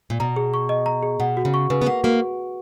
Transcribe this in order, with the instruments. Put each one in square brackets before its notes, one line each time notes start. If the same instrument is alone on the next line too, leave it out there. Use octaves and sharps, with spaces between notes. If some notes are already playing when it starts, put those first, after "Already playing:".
[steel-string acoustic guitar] A#2
[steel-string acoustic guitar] B2 [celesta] A#5
[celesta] G#4
C#6
D#5
A#5
G#4
[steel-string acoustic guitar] B2 [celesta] F#5
[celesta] F#4
[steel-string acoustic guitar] C#3
[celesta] C#6
[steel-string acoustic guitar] C#3 [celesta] B4
[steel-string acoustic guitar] B3
[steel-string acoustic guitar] A#3 [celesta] F#5
[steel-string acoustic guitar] A#3 [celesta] F#4